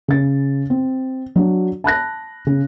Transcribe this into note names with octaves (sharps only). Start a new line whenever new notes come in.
C#3 A6
C4
F#3 D4 F#4
A5 B5 F#6 A#6
C#3